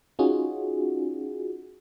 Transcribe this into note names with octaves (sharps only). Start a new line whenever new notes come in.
C#4 D#4 F4 F#4 G#4